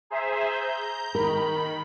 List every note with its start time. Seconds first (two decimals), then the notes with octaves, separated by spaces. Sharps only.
0.10 G#4 C5 E5 A#5
0.49 G6
1.15 D#3 A#4 B5